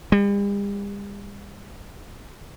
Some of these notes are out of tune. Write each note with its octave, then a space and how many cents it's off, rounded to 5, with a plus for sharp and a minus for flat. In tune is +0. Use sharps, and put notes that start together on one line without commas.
G3 +45